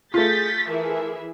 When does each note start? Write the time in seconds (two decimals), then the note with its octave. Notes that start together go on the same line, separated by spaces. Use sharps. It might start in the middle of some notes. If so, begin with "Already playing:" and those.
0.14 A3 F4 G#4 G6 A6 B6
0.68 E3 G#4 A#4 E5